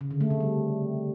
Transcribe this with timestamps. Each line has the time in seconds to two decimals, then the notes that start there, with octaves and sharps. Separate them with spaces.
0.01 C#3
0.11 D3
0.21 A3
0.30 C3
0.40 G3